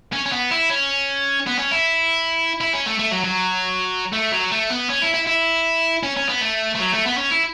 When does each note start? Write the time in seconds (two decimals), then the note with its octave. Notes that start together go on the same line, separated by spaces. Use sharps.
0.13 C#4
0.26 C#4
0.32 B3
0.51 E4
0.70 C#4
1.47 B3
1.58 C#4
1.71 E4
2.61 E4
2.73 C#4
2.86 A3
2.99 A3
3.11 F#3
3.24 F#3
4.13 A3
4.32 F#3
4.51 A3
4.70 B3
4.90 C#4
5.02 E4
5.15 E4
5.27 E4
6.03 C#4
6.17 C#4
6.29 B3
6.42 A3
6.75 A3
6.80 F#3
6.93 A3
7.06 B3
7.18 C#4
7.31 E4